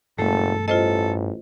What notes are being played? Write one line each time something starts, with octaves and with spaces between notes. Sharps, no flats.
F#1 G2 B2 E3 A3 A4
A1 F4 A4 C5 D#5